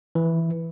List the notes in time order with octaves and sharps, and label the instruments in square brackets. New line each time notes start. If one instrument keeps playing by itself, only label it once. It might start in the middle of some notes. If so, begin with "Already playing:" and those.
[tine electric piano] E3